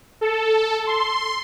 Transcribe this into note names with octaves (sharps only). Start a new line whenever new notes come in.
A4
C6